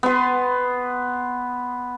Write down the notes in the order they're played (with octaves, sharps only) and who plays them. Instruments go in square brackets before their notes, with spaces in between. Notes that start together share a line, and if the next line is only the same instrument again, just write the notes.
[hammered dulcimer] B3 C6